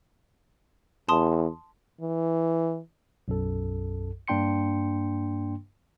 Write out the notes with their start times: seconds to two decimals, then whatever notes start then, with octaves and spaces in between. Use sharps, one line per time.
1.09 E2 A5 C6 D#6
2.01 E3
3.28 B1 F#2 A4
4.28 G2 A#3 D4 G5 C6 C#7